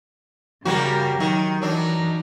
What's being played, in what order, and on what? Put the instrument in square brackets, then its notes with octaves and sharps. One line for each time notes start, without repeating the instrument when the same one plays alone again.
[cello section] C#3 G4 A#4 [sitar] G3 A#3 F#4
[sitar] D#3 [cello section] F#3
[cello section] E3 D#4 A#4 [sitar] F#3 D4